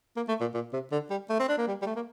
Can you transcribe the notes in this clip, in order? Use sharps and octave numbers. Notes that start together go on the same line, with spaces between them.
A#3
A3
A#2
A#2
C3
D3
G3
A3
C4
D4
A#3
G3
G3
A3
A#3